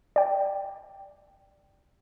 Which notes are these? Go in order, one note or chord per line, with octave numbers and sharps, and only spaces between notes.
D5 G5